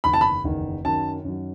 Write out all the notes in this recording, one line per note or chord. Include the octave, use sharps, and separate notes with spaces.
F#1 E2 D#3 B5
A5
B5
F#1 E2 D#3
F#2 D#3 F#3 A5
F#2 D#3 F#3